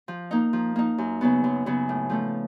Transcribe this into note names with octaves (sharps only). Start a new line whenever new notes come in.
F3
A#3 D#4
F3
A#3 D#4
F#2
C#3 F#3 B3
F#2
C#3 F#3 B3
A2
F3 A3 C#4